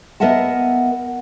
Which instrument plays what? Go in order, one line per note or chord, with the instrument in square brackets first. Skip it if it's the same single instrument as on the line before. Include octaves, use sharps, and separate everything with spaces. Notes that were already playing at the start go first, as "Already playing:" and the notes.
[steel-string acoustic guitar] B3 A#4 D#5 E5 F#5 A5